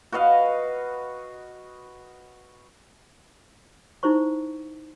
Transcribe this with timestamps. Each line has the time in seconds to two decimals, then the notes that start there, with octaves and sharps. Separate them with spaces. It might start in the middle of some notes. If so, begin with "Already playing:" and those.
0.12 F#4 B4 D#5 F5
4.03 D#4 E4 A#4 C5 C#6